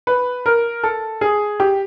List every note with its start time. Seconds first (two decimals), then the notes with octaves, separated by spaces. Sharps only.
0.07 B4
0.46 A#4
0.83 A4
1.21 G#4
1.60 G4